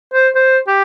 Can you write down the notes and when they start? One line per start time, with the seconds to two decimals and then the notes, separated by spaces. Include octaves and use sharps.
0.13 C5
0.35 C5
0.67 G4